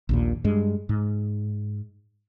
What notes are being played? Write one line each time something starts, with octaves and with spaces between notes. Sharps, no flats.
A#1 D#2 A#2
G2 G#3
G#2